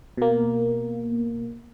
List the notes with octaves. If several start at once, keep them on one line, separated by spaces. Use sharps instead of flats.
B2 A#3